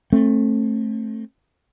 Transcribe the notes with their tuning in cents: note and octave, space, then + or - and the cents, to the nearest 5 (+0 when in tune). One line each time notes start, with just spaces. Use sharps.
A3 +0 C4 +35